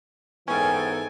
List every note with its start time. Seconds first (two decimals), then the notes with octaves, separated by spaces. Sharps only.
0.48 G#2 E3 B3 C#4 A4 A#4 G5 G#5